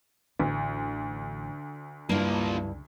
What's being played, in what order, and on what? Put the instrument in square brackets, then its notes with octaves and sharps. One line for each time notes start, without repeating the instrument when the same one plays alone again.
[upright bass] A1 [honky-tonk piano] D2
[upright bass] C#2 [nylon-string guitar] G2 E4 [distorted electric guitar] F3 A#3